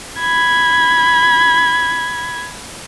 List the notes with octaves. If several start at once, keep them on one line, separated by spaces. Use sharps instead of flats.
B5 G#6